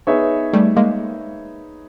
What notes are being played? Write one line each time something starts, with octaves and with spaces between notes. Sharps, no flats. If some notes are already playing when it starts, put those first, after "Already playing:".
B3 D#4 G#4 C#5 E5
G3 A3
G#3 A#3